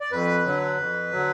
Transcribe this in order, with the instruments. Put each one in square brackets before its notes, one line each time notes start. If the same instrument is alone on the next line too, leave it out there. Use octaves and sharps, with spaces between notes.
[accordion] D5
F2 B4
D3 F#3
F2
D3 F#3